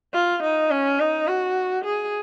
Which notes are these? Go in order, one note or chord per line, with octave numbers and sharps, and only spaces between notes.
F4
D#4
C#4
D#4
F#4
G#4